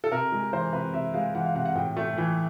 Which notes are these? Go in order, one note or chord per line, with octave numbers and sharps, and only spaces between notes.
A4
C3 A#4
G#3
E3 C5
C3 B4
C3 E5
G#3 F5
E3 F#5
F5
C3 F#5
F#5
A2 G5
A3
E3